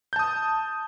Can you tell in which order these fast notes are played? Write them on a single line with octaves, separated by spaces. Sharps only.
G6 A5 D#6